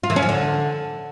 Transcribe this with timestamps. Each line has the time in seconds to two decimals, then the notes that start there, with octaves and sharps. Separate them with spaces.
0.03 F4
0.10 E3
0.16 C#4
0.22 F3
0.29 D3